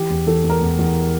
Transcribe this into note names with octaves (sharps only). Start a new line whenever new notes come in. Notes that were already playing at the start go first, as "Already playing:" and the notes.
Already playing: E3 G4
E2
E3 A4
E2
A#4
E2
E2